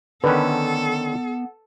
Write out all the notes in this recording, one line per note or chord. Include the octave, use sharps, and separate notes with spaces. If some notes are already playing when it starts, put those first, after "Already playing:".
D3 D#3 B3 C#4 A4 B4